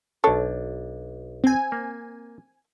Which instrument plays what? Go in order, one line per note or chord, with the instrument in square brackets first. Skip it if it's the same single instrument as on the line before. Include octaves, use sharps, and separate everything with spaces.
[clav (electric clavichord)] B1 D4 [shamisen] A4 C#5
[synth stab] C4 G#5
[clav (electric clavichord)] A#3